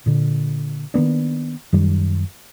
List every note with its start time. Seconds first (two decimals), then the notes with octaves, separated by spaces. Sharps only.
0.06 A#2 D3
0.94 D#3 A#3 B3 D4
1.73 F#2 D#3 G3